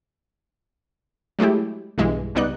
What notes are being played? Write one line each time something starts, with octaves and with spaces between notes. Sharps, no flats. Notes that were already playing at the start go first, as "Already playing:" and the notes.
F#3 G#3 A3 E4 G4
B1 G2 E3 G#3
C#2 G3 B3 D#4 D5 F#6